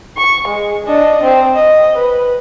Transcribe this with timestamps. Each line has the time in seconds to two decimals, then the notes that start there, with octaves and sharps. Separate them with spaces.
0.17 C#6
0.48 G#3
0.86 D4 D#5
1.23 C4
1.55 D#5
1.97 B4